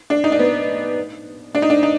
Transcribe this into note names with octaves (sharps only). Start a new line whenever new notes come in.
D4
D#4
D4
B3
D4
D#4
D4
D#4